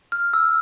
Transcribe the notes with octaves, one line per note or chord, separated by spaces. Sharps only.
F6
E6